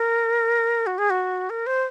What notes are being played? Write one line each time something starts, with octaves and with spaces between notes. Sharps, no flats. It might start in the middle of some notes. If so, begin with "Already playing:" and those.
Already playing: A#4
F#4
G#4
F#4
A#4
C5